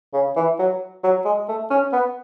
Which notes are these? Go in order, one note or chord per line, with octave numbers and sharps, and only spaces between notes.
C#3
E3
F#3
F#3
G#3
A3
C#4
B3